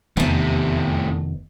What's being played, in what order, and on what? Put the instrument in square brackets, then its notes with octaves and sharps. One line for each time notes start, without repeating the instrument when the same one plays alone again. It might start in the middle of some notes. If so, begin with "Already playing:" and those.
[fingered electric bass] F1 D#3 B3 [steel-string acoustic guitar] E2 A3 [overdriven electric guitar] A2 C3